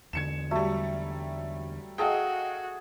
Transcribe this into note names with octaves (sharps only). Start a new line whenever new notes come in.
E2 D3 G#6 C#7 E7
F#3 G3 A3
F#4 G#4 A4 D#5 F5 G5